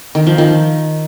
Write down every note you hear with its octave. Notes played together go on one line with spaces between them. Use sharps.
D#3
F3
D#3